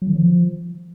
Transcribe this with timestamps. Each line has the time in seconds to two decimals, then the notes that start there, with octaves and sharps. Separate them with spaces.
0.02 F#3
0.09 D#3
0.16 F3